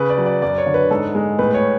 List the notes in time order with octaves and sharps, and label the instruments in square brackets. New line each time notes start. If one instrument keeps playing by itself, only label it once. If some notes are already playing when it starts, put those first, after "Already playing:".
Already playing: [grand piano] C#3 B4
D5
F#3
D5
F#2 D5
C#5
D3
B4
G#2 A4
G#3
A2 B4
C#5